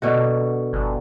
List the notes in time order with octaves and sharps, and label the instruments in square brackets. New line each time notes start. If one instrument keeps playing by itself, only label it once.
[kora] B2 D3 F#4
[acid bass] G1